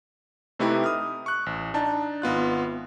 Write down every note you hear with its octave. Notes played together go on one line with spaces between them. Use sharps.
C3 A3 D#4 E4 G4 B4
D#6 F6
C#6 F#6
A1
D4 D#4 A5
G#1 B3 F4 F#6